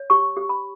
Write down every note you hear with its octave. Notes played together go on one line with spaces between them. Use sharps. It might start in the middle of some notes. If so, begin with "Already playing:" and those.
Already playing: C#5
G4 C#6
G4
B5